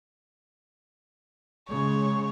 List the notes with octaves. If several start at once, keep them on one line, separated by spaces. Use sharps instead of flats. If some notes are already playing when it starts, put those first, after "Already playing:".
C#3 G#3 C#5